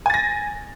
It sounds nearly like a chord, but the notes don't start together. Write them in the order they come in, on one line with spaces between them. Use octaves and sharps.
G#5 A6 A#6